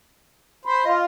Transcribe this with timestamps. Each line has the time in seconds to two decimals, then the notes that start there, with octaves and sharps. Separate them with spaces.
0.65 C5 B5
0.85 F4 D#5